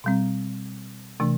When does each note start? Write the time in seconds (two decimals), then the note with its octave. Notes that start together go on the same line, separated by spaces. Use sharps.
0.04 B2 G3 C4
1.20 C3 E3 A3 D4